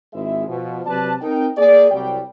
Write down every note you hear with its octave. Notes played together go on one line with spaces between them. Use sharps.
G#1 G#3 E4 E5
B2 F3
C3 F#3 B4 D5 A5
C4 D#4 A#4 G5
A#3 G#4 D5
C2 F#3 G3 G5